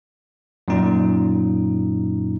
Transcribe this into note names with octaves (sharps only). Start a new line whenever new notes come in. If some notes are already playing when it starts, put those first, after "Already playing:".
F#2 A#2 D#4